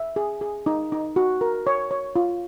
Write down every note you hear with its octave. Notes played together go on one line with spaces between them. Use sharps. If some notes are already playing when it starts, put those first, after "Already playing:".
Already playing: E5
G#4
G#4
D#4
D#4
F#4
A#4
C#5
C#5
F4